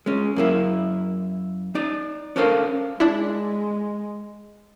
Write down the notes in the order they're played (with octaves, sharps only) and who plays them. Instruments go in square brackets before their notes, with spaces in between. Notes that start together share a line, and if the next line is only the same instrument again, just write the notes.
[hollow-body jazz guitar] G#3 C#4
F#2 A#3 E4
D#4 D5
C#4 D4 A4 A#4 C5 F5
[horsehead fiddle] G#3 [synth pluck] D4 E4